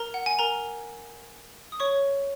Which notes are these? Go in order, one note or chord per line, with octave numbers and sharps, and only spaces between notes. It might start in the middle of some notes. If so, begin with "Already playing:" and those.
Already playing: A#4 A#5
F#5
G#5
A#4 A#5
D#6
C#5 C#6